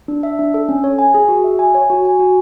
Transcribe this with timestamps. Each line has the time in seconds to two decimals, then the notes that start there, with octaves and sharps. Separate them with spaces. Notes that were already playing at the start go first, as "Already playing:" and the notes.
0.08 D4
0.23 E5
0.39 D4
0.54 A4
0.69 C#4
0.84 C#5
0.99 G#5
1.14 G#4
1.28 F#4
1.44 E5
1.59 G#5
1.74 C#5
1.90 F#4
2.05 G#5
2.19 F#4